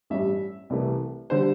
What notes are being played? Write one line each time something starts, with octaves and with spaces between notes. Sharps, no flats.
A1 G2 G3 E5
C2 C3 E3 A3
D3 G3 C5